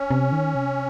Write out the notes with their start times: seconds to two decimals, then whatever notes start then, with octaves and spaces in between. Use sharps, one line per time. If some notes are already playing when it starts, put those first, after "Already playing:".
Already playing: C#4
0.11 C3
0.32 D#3
0.55 C3